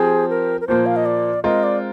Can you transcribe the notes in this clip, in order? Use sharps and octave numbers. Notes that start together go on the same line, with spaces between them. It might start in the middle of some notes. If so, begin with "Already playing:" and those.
Already playing: F3 C4 G4 G#4
A#4
A#4
A#2 F3 A#3 C5
F5
D#5
D5
G#3 C4 F4 A#4 D#5
D5